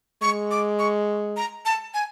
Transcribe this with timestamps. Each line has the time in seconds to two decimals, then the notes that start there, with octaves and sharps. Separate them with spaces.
0.22 G#3 C#6
0.51 D6
0.79 C#6
1.37 A#5
1.65 A5
1.94 G#5